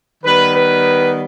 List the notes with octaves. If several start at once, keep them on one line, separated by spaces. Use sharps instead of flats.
D#3 G3 B3 B4
B4